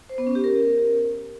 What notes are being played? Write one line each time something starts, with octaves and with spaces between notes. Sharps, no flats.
C5
B3
C#4
G4
A#4